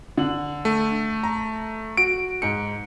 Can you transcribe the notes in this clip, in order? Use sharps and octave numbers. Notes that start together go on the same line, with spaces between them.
D3 F#7
A3
A#5
F#4 D7
G#2 C#7